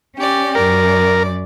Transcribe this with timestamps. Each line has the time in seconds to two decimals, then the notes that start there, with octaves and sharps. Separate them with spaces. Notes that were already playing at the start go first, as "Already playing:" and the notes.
0.16 C#4 G4 D5
0.55 F#2 A#4 D5